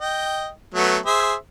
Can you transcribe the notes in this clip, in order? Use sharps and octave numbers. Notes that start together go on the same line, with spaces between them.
D#5 G5
F#3 A3 B3
G#4 C5 E5